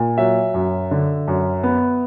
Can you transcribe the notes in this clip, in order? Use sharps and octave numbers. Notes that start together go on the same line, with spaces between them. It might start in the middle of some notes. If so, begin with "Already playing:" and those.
Already playing: A#2
F#3 E5
F#2
D3
F#2
B3